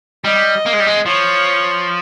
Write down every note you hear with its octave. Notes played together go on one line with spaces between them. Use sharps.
G3 D#5
A#3
G#3
G3
G#3
F3 C#5